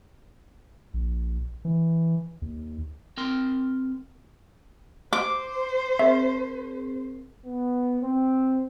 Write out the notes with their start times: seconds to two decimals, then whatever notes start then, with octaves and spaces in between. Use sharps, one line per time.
0.94 A#1
1.65 E3
2.42 D#2
3.17 C4 A#4 C6
5.13 C5 D6
5.99 C4 G#4 A#4 E5
7.45 B3
8.00 C4